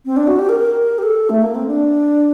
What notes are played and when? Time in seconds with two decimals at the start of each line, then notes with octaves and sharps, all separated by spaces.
0.05 C4
0.17 D4
0.27 F#4
0.39 G4
0.49 A#4
0.59 A#4
0.98 G4
1.03 A4
1.30 A3
1.42 A#3
1.55 C4
1.67 D4